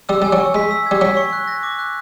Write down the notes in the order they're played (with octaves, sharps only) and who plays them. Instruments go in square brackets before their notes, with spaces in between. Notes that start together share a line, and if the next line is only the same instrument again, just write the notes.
[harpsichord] G3 [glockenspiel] E6
[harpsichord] G3 [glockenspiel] G#5
[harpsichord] F#3
[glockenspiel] C#6
[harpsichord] G#3 [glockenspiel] B6
[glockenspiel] E6
[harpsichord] G3 [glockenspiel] G#6
[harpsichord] F#3 [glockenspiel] B6
[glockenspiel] C#6
F#6
A#6
D6
F#6